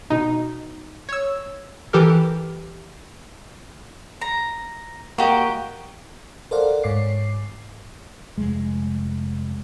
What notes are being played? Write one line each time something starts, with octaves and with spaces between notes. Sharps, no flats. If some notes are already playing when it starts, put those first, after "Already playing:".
B2 D#4
C#5 E6
E3 G4 A4 A#4
A#5
A#3 F#4 G4 D#5
A4 A#4 C5 D5 F5 F#5
G#2 C#5 D6 C7
F1 G#3